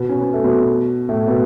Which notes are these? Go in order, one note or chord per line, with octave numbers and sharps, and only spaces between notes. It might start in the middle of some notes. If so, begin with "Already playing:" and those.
Already playing: B2 B3
C#4
B3
A3
B2 B3
A2 A3
B2 B3